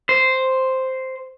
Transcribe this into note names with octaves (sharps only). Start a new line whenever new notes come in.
C5